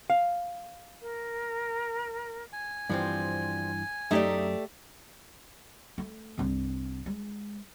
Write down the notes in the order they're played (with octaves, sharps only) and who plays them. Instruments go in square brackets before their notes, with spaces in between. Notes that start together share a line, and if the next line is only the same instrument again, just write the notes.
[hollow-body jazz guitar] F5
[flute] A#4
[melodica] G#5
[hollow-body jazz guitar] G2 E3 [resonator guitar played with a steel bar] F3 G3 C4
[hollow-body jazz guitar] F#2 [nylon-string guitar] A3 G4 D5 [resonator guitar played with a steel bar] D#4 E5
[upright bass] A3
C2 G2
G#3